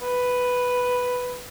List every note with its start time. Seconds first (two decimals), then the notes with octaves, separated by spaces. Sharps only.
0.02 B4